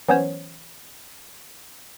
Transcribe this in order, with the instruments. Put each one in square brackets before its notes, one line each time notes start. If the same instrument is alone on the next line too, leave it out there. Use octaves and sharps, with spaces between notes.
[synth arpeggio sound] E3 F#3 B3 C#4 C5 C#5